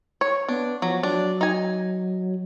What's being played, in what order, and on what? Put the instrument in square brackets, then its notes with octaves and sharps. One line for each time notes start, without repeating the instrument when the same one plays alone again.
[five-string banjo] C#5
[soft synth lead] B3 [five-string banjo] D4
[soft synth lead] F3 [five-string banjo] F#3
[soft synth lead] F#3 [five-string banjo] D4
[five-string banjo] D#4 G#5